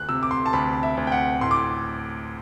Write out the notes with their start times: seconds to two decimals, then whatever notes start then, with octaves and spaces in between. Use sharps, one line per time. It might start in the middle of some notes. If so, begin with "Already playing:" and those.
Already playing: D2 F#6
0.09 C3 E6
0.23 D6
0.31 C6
0.46 A5
0.53 D2 B5
0.83 E5
0.97 D2
1.07 G5
1.12 F#5
1.41 A2 C6
1.51 D6